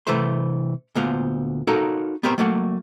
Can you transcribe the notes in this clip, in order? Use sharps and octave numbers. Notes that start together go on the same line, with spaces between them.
C3 E3 A3 B4 C5 C6
D2 A#2 B3 C5 F5
D#4 F#4 A4 A#4 C#5 F5
B3 C4 G4 A#4 C5 C#5
F#3 A3 A#3 F#5